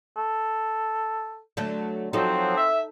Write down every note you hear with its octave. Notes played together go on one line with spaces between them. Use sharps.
A4
D3 F#3 A3
F3 F#3 C4 D#4 A4
E5